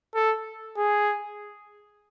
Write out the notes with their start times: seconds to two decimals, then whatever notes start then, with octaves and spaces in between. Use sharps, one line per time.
0.15 A4
0.77 G#4